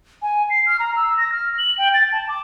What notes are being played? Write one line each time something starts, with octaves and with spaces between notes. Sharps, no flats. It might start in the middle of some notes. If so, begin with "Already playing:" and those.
G#5
C7
F6
A#5
E6
A#6
F6
F#7
G5
A6
A5
D6